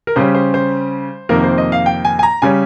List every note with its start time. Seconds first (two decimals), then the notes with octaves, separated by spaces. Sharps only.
0.07 A#4
0.16 C#3 G3 C#4 C5
0.35 C5
0.54 C5
1.29 F2 C3 D#3 A#3 A#4
1.43 C5
1.58 D#5
1.72 F5
1.86 G5
2.05 G#5
2.19 G#5
2.23 A#5
2.42 C#3 G3 C#4 G#5